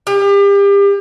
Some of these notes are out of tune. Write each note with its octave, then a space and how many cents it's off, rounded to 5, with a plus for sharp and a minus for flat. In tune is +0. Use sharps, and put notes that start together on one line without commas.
G4 +35